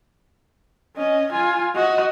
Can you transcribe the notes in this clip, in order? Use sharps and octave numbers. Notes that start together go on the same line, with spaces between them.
C#4 D#5
F4 G#5
F#4 D#5